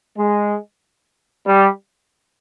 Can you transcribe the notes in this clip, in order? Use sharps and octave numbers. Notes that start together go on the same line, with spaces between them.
G#3
G3